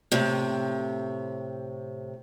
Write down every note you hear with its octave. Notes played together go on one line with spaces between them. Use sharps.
A2 C3